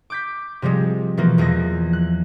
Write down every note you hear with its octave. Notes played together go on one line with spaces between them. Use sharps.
D6 G6 B6
C3 F3 G3 G#3
B2 E3 F3 A#3
E2 F3 G#3 A#6
F#6